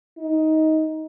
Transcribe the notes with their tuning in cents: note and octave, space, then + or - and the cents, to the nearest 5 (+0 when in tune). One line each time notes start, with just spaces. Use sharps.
D#4 +15